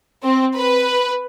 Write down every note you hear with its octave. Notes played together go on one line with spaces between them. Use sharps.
C4
B4